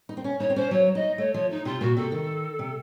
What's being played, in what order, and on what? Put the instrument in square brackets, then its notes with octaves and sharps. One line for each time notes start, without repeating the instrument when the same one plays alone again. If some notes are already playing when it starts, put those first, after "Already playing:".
[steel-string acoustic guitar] D#4
C4
C#4
[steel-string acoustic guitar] D#4 [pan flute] C#5
[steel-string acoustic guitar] C4
[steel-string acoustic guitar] C#4 [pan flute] C5
[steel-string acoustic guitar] F#3 [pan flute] C#5
[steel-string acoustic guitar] D#4 [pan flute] D#5
[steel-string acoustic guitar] A3 [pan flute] C#5
[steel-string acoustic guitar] F3 [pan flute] C#5
[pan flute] D#4
[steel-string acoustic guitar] C3 [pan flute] F4
[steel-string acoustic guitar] A#2 [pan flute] F#4
[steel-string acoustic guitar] C3 [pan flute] A4
[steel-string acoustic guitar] D#3
C3